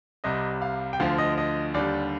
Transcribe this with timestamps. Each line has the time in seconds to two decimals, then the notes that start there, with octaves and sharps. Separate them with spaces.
0.24 C2 C3 G3 D#5
0.62 F5
0.93 G5
1.00 D2 D3 F3 F5
1.18 D#5
1.38 D#5
1.74 D#2 D3 G3 D5